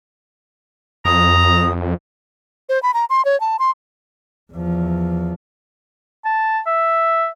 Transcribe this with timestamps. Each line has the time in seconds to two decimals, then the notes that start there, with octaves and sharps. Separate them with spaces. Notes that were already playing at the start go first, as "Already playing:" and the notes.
1.05 F2 A#5 D#6
2.69 C5
2.83 B5
2.94 A#5
3.10 C6
3.25 C#5
3.40 A5
3.59 C6
4.53 E2 F3
6.25 A5
6.67 E5